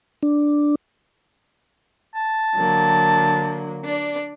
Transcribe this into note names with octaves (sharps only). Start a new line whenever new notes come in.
D4
A5
D3 F#3 A#3
D4 D5